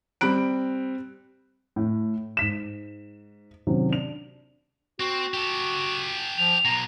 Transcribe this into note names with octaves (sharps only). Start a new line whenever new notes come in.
G3 C4 B5 F#6 D7
A2
G#2 B6 E7
C3 D#3 F#3 C#4
D4 F7
C4 F#4
G4 A4
F3 F7
B1 B2 A#5